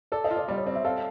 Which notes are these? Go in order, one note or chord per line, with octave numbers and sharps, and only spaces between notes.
A4 D5
D#5
F4
D5
G3 D5
C#5
C4 D5
E5
A4 F5